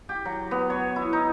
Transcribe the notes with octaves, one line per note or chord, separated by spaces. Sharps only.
G4
F#3
B3
C#5
E4
D#4